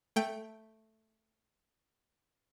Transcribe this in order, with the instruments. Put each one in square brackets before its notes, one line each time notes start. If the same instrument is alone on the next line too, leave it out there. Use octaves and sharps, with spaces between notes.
[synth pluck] A3 G5